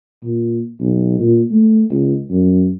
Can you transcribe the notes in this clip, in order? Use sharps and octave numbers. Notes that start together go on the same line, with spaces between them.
A#2
B1
A#2
A3
C#2
F#2